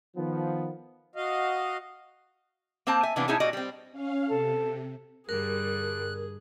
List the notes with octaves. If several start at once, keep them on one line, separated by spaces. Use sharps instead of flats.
D#3 F3 B3
F#4 D#5 F5
A#3 C4 C5 A5
E5 G#5
C3 E3 A#3 B3 D4
B2 D#4 E4 G#4 C#5 A5
A#2 G3 F#4 D5 D#5
G3 C4
C#4 F5
C3 A4
G2 D3 G3 G#4 A#4 F#6